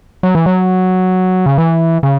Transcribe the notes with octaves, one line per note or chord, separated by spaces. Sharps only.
F#3
E3
F#3
C#3
E3
C#3